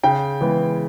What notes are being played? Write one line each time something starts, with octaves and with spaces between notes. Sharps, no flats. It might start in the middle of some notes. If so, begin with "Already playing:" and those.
C#3 G5
E3 G#3 B3